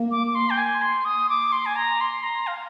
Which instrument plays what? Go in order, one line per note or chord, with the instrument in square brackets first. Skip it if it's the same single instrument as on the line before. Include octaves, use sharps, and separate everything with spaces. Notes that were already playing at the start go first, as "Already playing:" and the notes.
Already playing: [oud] A#3
[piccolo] D6
D6
C6
G5
G#5
C6
D#6
D6
C6
G#5
A#5
C6
A#5
F5